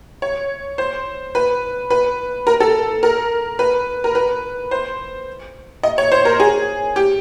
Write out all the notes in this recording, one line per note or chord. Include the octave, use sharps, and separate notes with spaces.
C#5
C5
B4
B4
A#4
A4
A#4
B4
A#4
B4
C5
D#5
C#5
C5
A#4
G#4
G4